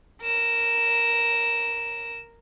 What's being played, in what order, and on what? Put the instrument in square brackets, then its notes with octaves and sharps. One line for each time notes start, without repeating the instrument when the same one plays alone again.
[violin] A#4 E7